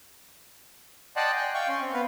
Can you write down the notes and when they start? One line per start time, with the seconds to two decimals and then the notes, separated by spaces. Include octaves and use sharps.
1.16 D5 D#5 F#5 G5 A5 C6
1.35 G5 G#5
1.54 F5 G5 C#6
1.68 C#4 C6
1.82 C4
1.94 B3 B4 F5